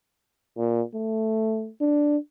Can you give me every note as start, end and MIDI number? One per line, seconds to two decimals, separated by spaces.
0.58 0.82 46
0.95 1.70 57
1.81 2.17 62